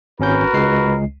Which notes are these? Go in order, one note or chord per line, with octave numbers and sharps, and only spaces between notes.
G#1 C#4 F#4 A#4 B4 G6
C#2 G#3 C7